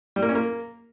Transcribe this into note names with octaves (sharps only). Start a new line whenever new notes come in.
G3
A#3
C#4
A#3